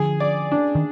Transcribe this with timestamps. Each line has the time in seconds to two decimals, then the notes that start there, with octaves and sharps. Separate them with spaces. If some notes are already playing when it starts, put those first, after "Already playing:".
Already playing: D3 F3 G#4
0.20 D5
0.52 D4
0.75 D#3